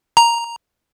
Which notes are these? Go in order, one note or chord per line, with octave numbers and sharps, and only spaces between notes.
A#5